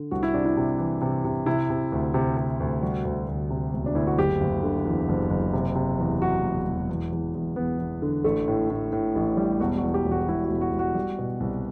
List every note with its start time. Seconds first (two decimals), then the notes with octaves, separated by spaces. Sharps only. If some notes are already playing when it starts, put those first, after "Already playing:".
Already playing: D3
0.11 C2 F#4
0.23 E4
0.34 C3 D4
0.45 E4
0.57 C3
0.78 E3
1.01 C3
1.25 C3
1.46 C3 E4
1.70 C3
1.92 D2
2.14 C3
2.37 C3
2.60 D2
2.82 G3 F#4
3.05 D2
3.28 D2
3.50 C3
3.73 E1
3.86 D4
3.95 D2 E4
4.07 F#4
4.18 F#1 G4
4.41 F#1
4.63 D3
4.85 E2
5.09 F#1
5.30 F#1
5.53 C3
5.75 C3
5.98 E2
6.21 F#3 F#4
6.43 E1
6.67 E1
6.89 E2
7.12 E2
7.35 E2
7.56 E2 B3
7.79 E2
8.02 D3
8.24 A1 A3
8.48 A2
8.70 A2
8.92 A2
9.15 A1
9.37 G3
9.60 E1 F#4
9.78 F#4
9.83 E2
9.94 G4
10.05 E1
10.11 F#4
10.28 E1 E4
10.45 F#4
10.50 E1
10.61 F#4
10.73 E1
10.79 F#4
10.95 G3
11.18 B2
11.40 C2